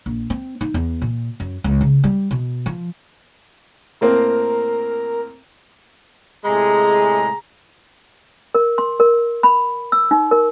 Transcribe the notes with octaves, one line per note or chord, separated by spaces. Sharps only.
A#1
C4
D#4
E2
A#2
F#2
C#2
C#3
G3
B2
F3
A2 A#3 C4 A#4
A2 C3 G#3 G#4 A#5
A#4
C6
A#4
B5
E6
D#4
A#4